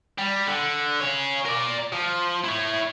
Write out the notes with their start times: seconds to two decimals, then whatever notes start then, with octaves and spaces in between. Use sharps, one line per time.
0.18 G3
0.47 D3
1.01 G#4 C#5
1.45 A#4 D5
1.93 F3
2.44 E4 C#5